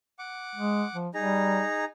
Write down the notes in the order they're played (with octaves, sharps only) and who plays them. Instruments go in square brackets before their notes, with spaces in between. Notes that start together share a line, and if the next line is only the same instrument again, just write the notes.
[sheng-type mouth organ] F#5 D6
[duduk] G#3
F3
[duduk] G3 [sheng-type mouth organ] D#4 G#4 A#5